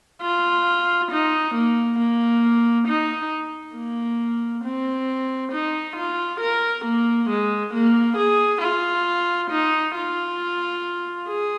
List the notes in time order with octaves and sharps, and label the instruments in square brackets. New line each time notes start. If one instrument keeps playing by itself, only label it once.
[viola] F4
D#4
A#3
A#3
D#4
A#3
C4
D#4
F4
A#4
A#3
G#3
A#3
G#4
F4
D#4
F4
G#4